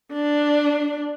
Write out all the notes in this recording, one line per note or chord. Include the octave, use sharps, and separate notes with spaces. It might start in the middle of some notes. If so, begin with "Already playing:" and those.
D4